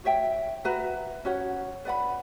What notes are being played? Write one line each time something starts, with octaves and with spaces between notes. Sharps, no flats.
F#4 C#5 E5 G5
F#4 B4 E5 A#5
C#4 F#4 C#5 F#5
B4 D5 F#5 B5